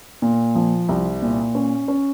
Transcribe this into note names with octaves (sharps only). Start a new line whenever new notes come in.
A#2
F3
C2
A#2
C#4
C#4